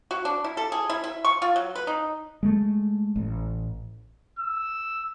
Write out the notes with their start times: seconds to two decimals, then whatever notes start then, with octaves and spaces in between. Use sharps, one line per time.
0.11 F#4
0.25 D4
0.44 E4
0.57 A4
0.72 G#4
0.90 E4
1.04 E5
1.25 C#6
1.42 F4
1.56 F#3
1.75 B4
1.87 D#4
2.43 G#3 A3
3.16 A1
4.39 E6